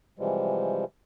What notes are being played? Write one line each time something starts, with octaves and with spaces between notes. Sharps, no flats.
C3 E3 F3 G3 G#3